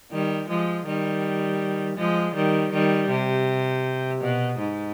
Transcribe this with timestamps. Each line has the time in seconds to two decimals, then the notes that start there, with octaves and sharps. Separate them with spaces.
0.11 D#3 G3
0.49 F3 G#3
0.86 D#3 G3
1.97 F3 G#3
2.35 D#3 G3
2.72 D#3 G3
3.10 C3
4.21 B2
4.59 G#2